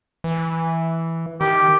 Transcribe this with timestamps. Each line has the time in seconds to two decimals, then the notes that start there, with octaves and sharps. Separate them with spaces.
0.24 E3
1.41 D#3 G4